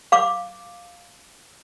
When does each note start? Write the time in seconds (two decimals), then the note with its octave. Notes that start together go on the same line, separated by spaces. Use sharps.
0.12 F5 D6